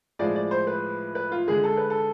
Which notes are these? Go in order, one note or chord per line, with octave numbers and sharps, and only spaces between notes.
A2 F3 G#3 D5
D5
C5
B4
B4
F4
D3 G#3 G#4
A4
B4
A4